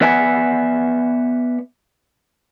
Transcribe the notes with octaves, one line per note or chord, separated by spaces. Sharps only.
B3 B4 D5 E5 F#5 G#5